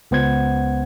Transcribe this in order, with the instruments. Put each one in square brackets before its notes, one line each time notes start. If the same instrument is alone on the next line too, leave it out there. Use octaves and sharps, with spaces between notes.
[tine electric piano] C#2 B3 C5 F#5 G#6